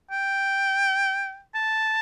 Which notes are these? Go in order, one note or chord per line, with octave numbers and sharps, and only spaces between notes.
G5
A5